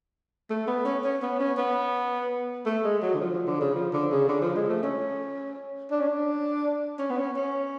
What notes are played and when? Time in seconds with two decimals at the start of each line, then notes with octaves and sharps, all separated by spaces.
0.50 A3
0.67 B3
0.85 C#4
1.04 C#4
1.22 B3
1.40 C#4
1.58 B3
2.66 A3
2.84 G#3
3.02 F#3
3.14 D3
3.21 F3
3.34 F3
3.47 D3
3.61 C#3
3.75 F3
3.93 D3
4.11 C#3
4.28 D3
4.42 F3
4.55 G#3
4.70 A3
4.83 C#4
5.91 D4
6.00 C#4
6.07 D4
6.99 C#4
7.10 B3
7.18 C#4
7.36 C#4